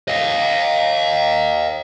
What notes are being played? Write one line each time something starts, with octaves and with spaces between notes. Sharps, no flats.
D#5 F5